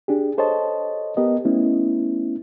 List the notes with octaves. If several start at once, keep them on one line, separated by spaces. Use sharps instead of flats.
D4 G4 G#4
A4 C5 C#5 D#5 A5
B3 G4 A#4 D#5
A3 B3 C#4 E4